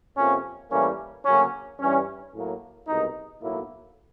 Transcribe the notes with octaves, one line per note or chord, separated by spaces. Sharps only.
F2 C3 F3 A#3 C#4
A2 E3 G3 A#3 C#4
D2 C#3 F#3 A#3 C#4
G2 E3 G3 C#4
A2 F#3 A#3
C2 B2 G#3 D#4
B1 A2 F#3 A#3 E4